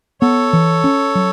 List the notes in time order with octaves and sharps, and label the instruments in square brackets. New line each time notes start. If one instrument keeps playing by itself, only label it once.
[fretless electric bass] B3 [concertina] A4 C#5
[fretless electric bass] E3
C#4
F#3